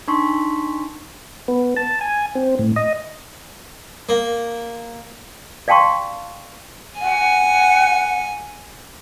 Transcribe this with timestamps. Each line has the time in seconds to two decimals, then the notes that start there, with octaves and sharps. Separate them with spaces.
0.08 D4 D#4 A5 C6 C#6 B6
1.48 B3
1.77 A5
2.01 G#5
2.35 C4
2.59 A2
2.76 D#5
4.09 A#3
5.68 D5 F5 G5 A5 C6 C#6
7.01 F#5 G#5